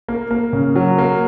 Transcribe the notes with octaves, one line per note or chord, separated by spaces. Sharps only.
A#3
A#3
C#3
F#3
A#3